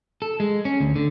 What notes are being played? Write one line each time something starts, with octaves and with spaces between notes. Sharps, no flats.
A4
G#3
C#4
D2
D3